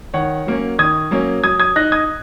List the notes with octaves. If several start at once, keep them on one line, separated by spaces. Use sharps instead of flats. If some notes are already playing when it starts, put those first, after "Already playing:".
D#3 C#5 F#5
F#3 A#3 C#4
D#3 D#6 G#6
F#3 A#3 C#4
F#3 D#6 G#6
D#6 G#6
D#4 F#6 A#6
D#6 G#6